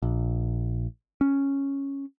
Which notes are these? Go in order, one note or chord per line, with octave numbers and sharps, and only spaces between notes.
A#1
C#4